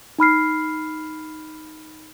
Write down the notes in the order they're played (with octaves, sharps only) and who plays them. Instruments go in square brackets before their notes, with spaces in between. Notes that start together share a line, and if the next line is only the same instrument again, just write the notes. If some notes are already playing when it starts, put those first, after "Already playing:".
[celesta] D#4 B5 F6 C7